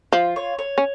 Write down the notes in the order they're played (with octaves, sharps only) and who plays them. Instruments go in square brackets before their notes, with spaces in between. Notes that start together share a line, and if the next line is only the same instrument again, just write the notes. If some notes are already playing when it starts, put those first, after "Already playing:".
[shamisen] F3 [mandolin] F4
[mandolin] C#5
C#5
[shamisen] C#4